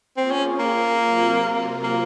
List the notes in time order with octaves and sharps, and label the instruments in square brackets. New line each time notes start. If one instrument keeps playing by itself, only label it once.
[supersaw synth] A#3 F4 G#4 [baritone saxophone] C4
[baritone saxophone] C#4
A#3
[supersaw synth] C3 F#3 C4 F4 A#4
[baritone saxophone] A#3